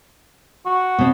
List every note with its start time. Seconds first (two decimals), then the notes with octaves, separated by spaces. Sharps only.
0.66 F#4
0.99 B2 C4